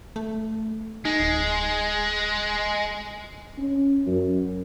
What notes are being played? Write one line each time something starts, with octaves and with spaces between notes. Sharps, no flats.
A3
G#3 D#4
D1
C#4
F#2